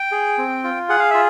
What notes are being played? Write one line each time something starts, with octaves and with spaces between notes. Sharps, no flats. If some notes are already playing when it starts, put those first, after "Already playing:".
Already playing: G5
G#4
C4
F4
G#4 F#5
F5
F4 E5